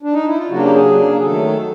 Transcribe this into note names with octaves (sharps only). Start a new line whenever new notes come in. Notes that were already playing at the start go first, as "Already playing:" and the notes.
D4
D#4
E4
F4
C#3 F#3 A#3 D4 F#4
G4
G#4
C#3 F#3 A#3 D4
G#4
D#3 F#3 A3 A4